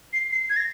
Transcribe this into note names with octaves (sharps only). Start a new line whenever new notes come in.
C7
C7
G#6
A#6